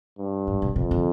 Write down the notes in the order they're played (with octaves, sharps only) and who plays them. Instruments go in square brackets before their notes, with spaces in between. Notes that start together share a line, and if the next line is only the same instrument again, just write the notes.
[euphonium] G2
[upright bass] G#2
B2
[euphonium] F2 [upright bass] C3
[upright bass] D3